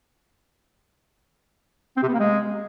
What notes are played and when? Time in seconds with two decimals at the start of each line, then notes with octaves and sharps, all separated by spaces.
1.97 C4
2.03 C3
2.08 B3
2.14 A#3
2.20 G#3